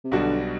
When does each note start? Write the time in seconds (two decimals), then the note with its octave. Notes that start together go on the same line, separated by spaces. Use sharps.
0.04 C3
0.11 B1 B2 D3 G3 D4 F#4